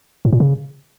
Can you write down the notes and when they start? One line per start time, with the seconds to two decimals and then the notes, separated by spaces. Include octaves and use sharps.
0.25 A2
0.32 A#2
0.40 C#3